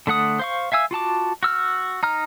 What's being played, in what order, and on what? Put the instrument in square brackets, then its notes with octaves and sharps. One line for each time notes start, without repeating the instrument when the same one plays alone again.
[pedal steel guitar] D3 A3 F#5 D#6
C5 F5 C#6
E5 F5 G#5 E6
F4 F#4 A5 D6
F#4 E6 F6
D#4 A#5 F6